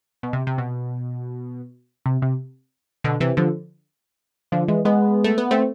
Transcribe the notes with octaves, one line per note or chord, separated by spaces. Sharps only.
B2
C3
C3
B2
C3
C3
B2 D3
C3 E3
D3 F3
D3 F3
E3 G#3
G#3 B3
A3
B3
A3 C4